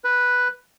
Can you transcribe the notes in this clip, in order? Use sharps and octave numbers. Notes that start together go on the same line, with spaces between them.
B4